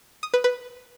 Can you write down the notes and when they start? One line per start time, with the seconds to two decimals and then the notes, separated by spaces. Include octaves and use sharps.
0.23 D#6
0.34 B4
0.44 B4